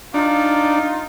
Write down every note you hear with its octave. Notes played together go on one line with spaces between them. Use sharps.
D4 D#4 F4